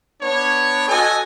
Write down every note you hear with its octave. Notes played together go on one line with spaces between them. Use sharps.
B3 D4 C#5
F#4 A4 D#5 G#5